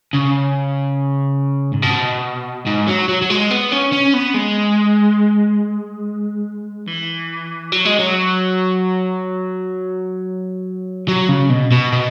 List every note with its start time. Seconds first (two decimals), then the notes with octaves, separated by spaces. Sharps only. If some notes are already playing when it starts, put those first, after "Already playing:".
0.14 C#3
1.74 G#2
1.83 B2
2.67 G#2
2.88 F#3
3.09 F#3
3.22 F#3
3.30 G#3
3.51 B3
3.72 C#4
3.93 C#4
4.14 B3
4.35 G#3
6.87 E3
7.72 F#3
7.85 G#3
7.99 F#3
11.08 F#3
11.29 C#3
11.50 B2
11.71 B2
11.92 B2